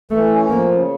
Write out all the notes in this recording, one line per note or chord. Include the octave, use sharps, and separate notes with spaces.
E3 A3
C#4
F3 A#3
C#3